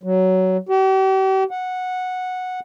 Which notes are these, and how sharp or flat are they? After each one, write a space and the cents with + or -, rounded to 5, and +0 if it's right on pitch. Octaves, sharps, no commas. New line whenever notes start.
F#3 +15
G4 -40
F#5 -10